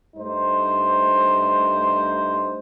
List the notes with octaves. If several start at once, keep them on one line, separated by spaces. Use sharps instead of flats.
G2 A3 D#4 C5